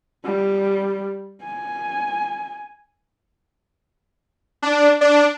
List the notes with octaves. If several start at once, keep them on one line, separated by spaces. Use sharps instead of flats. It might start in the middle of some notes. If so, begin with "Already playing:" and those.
G3
G#5
D4
D4